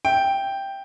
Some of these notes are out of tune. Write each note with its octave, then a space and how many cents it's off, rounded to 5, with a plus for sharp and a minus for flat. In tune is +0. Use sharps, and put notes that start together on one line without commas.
E5 +0 G5 +0